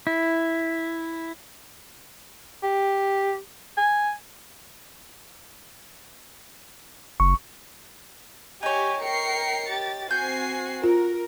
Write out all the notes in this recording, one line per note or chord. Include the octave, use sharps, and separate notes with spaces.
E4
G4
G#5
F#1 C#6
D#4 G4 C#5 G#5
A#4 G5 C7 C#7
G4 A6
C4 F#4 G#5 G6 C7
F4 A#4